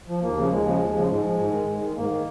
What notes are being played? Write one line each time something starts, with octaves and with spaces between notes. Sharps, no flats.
F3
D#2 A#3
C#3 F3
D#2 G#3
C#3 F3
D#2
C#3 F3
G#2 G#3
F3
G#2
D#3
G#2
D#3
G#2 A#3
D#3